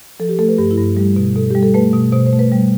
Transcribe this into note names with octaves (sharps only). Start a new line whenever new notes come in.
F3 A4
G4
A3 A4
B4
G2 G4
E4
G2
G3 G4
B2
B2 A4
G3 G4
A4
A3 B4
B2
B2 C5
C5
A3
B4
G3